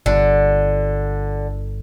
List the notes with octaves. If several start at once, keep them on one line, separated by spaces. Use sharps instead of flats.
G1 D3